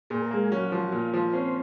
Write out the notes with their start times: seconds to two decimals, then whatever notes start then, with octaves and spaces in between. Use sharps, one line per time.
0.10 A#2 G#4
0.22 A#4
0.31 G#3 A#3 G#4
0.51 F#3 C#4 F#4
0.72 F3
0.92 A#2 F4
1.14 F3
1.33 C4 C#4 C5